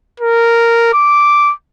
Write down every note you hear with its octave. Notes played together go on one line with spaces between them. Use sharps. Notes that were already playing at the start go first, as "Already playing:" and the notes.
A#4
D6